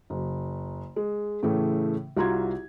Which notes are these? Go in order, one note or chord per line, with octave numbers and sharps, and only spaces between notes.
F#1
G#3
A2 C#3 E3 A3
C2 F4 F#4 A#5 C6 G#6